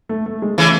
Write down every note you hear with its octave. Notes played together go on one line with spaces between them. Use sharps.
A3
A3
G#3
C#3 E3 A3